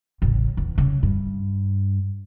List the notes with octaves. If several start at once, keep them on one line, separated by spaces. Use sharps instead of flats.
A1 C#3
E2
C#3
G2